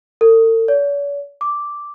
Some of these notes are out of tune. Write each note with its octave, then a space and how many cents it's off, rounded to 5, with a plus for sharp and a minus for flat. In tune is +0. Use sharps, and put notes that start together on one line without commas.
A4 +45
C#5 +45
D6 -5